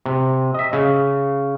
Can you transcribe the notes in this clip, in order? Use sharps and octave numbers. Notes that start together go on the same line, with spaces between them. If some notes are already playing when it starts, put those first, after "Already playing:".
C3
D#5 E5
C#3